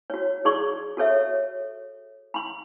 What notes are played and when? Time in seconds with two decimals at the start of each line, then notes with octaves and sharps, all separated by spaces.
0.10 F#4 C#5
0.45 G#4 D5 C6 C#6
0.97 F#4 A4 C#5 E5
2.34 B5 C6